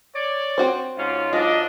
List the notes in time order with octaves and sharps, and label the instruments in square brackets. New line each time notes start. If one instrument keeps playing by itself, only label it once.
[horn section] C#5 D5
[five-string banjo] C4 F#4 C5
[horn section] G#2 C#4 F4
[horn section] G#2 F#3 D4 [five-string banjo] F4 [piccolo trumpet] D#5